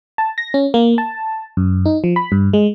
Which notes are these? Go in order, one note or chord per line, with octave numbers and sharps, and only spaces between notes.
A5
A#6
C#4
A#3
A5
F#2
D#4
F3
B5
G2
G#3